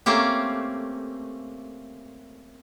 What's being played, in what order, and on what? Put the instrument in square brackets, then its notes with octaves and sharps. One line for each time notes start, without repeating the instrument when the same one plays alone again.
[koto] A3 A#3 C4 C#4 G4